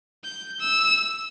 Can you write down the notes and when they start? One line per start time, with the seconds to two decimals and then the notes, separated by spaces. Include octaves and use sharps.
0.24 G6
0.60 E6